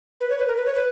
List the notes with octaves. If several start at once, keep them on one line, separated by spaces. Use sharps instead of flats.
B4
C#5
B4
A#4
B4
C#5
B4